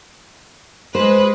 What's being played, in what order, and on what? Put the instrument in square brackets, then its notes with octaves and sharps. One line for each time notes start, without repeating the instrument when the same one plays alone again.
[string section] G#3 B4 [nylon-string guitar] C5